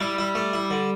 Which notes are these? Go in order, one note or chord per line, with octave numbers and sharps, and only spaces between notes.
G3 E4
E4
A3
E4
D3